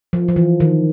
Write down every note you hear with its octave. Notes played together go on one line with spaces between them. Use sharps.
F3
F3
E3
D#3